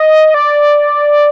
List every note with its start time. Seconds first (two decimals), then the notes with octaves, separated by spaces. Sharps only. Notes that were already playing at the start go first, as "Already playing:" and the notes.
Already playing: D#5
0.34 D5